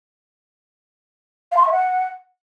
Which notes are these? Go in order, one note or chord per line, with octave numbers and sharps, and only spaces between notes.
F5
C6
C#6
E5
F#5